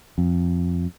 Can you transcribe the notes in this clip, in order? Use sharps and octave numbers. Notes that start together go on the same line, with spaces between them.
F2